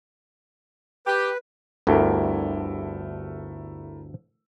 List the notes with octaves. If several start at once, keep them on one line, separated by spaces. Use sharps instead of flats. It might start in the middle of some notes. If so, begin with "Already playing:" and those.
G4 B4
G1 D2 G2 A3 E4 A#4